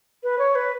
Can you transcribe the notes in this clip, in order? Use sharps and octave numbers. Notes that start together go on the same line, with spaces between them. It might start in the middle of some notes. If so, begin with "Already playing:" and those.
B4
C#5
B4